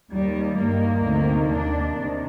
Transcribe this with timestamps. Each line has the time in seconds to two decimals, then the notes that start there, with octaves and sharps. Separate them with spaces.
0.12 D#2 D#3 G3
0.58 G2 D#3 A#3
1.04 D2 C3 D#3
1.50 D#2 D#3 D4
1.97 C3 D#3